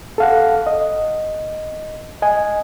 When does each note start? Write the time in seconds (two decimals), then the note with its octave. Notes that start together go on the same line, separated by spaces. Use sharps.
0.18 A4 F5 F#5
0.67 D#5
2.22 D#5 G#5